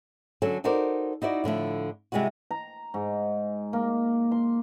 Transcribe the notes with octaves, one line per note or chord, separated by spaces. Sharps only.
D3 F#3 C#4 A4
D#4 F#4 A4 A#4 C5 D5
D#4 E4 F#4 D5
A2 D3 F3 E4
C3 G3 G#3 E4 F#4
A#5
G#2
A#3
C6